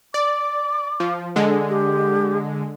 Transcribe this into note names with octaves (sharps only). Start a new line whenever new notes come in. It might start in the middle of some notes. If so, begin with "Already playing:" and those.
D5 D6
F3
D3 G#3
G4